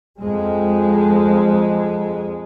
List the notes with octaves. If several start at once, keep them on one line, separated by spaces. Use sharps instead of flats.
F2 G#3